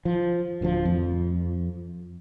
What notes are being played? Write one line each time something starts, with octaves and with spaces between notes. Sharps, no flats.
F3
D1 D2 D3 F3
F2